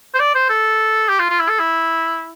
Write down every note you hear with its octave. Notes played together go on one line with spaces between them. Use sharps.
C5
D5
C5
A4
G4
F4
F4
E4
A4
E4